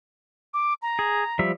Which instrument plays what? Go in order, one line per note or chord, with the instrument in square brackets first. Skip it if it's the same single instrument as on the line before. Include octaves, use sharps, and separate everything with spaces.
[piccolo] D6
A#5
[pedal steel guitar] G#4
F3 G3 E5